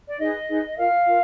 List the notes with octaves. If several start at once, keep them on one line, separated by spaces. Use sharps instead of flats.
D5
D#4 G#4 B4 D#5
D#4 G#4 B4
F4 A#4 F5
F4 A#4